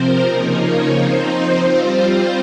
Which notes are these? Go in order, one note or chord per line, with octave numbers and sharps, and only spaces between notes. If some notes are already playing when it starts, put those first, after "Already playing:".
Already playing: C3 F3 C4 A#4 C5
C#3 F3 A#3 D#4 A#4
C#5
F3 C4 D#4 C5
C5
G3 C4 F4